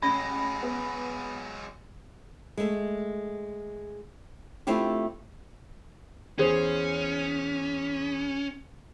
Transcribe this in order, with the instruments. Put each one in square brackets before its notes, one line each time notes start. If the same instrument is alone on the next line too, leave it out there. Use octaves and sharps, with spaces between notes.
[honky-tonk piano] A1 [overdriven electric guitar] F#3 G#3 [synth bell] B5 A#6
[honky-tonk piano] B3
[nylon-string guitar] G#3 A3
A3 C4 D4 E4 F4 G4
[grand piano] E2 G#4 C5 [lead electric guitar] C#4